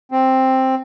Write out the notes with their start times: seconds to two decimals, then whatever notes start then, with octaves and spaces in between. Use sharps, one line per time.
0.12 C4